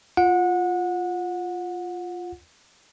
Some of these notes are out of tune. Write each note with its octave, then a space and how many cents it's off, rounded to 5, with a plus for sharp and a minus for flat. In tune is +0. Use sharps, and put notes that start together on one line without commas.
F4 +0 F#5 -25